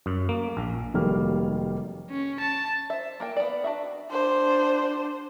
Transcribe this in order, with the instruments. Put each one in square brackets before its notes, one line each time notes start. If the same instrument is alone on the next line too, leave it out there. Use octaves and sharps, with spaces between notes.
[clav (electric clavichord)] F#2
A#3
A#1
[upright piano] F1 D#3 F#3 G3 A#3 F6
[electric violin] C#4
A5
[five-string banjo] C5 E5
A#3 A#4 G5
B3 D5
D4 F#4 E5
[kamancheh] D4 C5